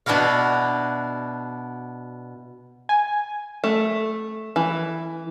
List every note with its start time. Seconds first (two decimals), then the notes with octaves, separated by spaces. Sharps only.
0.06 B2 D4 E4 F#4 F5
2.89 G#5
3.64 A3
4.56 E3